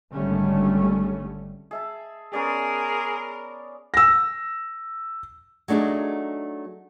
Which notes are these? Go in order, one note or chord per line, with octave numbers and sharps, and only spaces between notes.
G#1 D3 G3 A3 C#4
G#4 E5 A5
B3 C#4 G#4 A#4 D5
E6 A#6
F#3 A3 D4 D#4 G#4